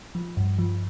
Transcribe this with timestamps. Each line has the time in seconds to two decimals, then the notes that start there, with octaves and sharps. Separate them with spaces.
0.15 F3
0.37 G2
0.59 F3